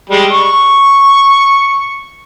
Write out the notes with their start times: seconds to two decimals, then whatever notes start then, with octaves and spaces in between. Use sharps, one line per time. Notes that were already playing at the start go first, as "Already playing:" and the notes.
0.10 G3 G#3
0.32 C#6